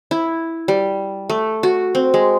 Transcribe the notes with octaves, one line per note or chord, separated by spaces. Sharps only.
E4
G3
A3
F#4
C4
G#3